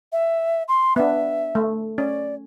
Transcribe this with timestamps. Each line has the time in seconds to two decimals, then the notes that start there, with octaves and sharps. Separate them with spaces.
0.12 E5
0.68 C6
0.96 B3 D4 E5
1.55 A3
1.98 C#4 D5